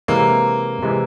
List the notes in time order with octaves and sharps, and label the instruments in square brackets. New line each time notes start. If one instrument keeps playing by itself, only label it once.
[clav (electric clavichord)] C3 E3 G#3 [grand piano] A#3
[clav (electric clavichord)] C3 E3 G#3